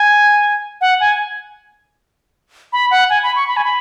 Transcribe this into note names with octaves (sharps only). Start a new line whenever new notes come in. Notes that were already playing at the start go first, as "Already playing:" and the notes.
Already playing: G#5
F#5
G#5
B5
F#5
G#5
B5
C#6
B5
G#5
B5